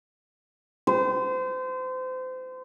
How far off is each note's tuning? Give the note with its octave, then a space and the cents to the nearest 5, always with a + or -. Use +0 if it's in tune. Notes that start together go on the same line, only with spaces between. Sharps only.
C5 -30